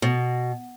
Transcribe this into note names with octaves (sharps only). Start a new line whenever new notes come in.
B2